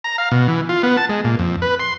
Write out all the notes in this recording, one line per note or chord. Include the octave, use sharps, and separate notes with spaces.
A#5
F5
B2
E3
F4
B3
A5
G#3
A#2
F2
B4
C6